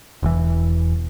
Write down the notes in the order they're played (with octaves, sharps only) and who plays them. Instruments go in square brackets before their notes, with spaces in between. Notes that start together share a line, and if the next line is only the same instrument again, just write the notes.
[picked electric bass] E1 E3